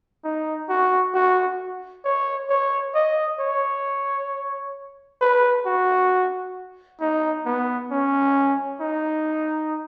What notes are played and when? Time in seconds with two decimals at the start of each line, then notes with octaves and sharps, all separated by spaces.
0.24 D#4
0.69 F#4
1.14 F#4
2.05 C#5
2.49 C#5
2.95 D#5
3.40 C#5
5.21 B4
5.66 F#4
7.00 D#4
7.46 B3
7.91 C#4
8.81 D#4